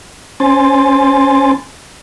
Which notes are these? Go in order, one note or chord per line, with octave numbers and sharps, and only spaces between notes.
C#4 C5 G#5 C6 A6